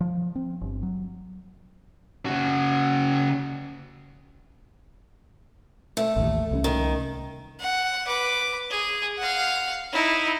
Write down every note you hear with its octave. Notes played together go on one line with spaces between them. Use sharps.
F3
C4
G1
F#3
C#3 F#4
A3
A1 D#2
C2 G3 C#4
D#3
F#5
B4 D6
G#4
F5 F#5
D#4 E4